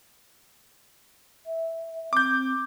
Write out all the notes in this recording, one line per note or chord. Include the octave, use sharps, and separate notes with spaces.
E5
C4 D6 G6